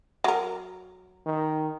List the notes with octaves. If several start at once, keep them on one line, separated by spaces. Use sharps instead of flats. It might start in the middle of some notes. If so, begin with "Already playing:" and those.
F#3 A#4
D#3